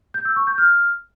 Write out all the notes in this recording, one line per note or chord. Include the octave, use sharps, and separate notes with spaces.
G6
E6
C#6
G6
F6